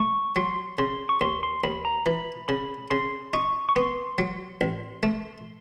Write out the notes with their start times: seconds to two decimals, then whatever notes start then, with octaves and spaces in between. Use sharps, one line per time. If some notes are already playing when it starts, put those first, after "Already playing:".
Already playing: A3 C#6
0.36 F#3 C6
0.79 C#3 C6
1.09 C#6
1.21 D#2 C6
1.43 C6
1.64 D#2 B5
1.85 A#5
2.06 E3 B5
2.48 C#3 B5
2.90 C#3 C6
3.33 D#4 C#6
3.69 C#6
3.75 B3 C6
4.18 F#3
4.61 A1
5.03 A3